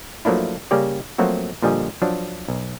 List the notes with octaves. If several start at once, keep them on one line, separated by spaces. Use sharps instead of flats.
F3 F#3 A3 A#3 D4 E4
C#3 G3 A#3 C#4 G4 D5
F3 F#3 A3 A#3 C4 F#4
A#2 D3 F3 G3 D#5 G#5
F3 F#3 D4
B1